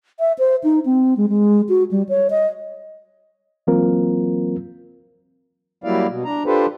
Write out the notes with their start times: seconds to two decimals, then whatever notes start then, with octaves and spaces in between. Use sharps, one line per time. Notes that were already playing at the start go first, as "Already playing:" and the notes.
0.20 E5
0.39 C5
0.64 D#4
0.86 C4
1.17 G#3
1.29 G#3
1.69 F#4
1.91 G3
2.09 C#5
2.30 D#5
3.67 E3 F#3 A#3 C4 F4 A#4
5.84 F#3 G3 A#3 E4 D5 F5
6.09 B2
6.25 D4 A#5
6.46 D4 F4 G4 A4 B4 C5